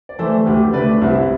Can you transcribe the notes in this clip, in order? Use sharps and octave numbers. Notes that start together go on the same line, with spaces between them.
D5
E3 A3 A4 C5
D2 G4 B4
D3 A3 B4 D5
C2 C4 E4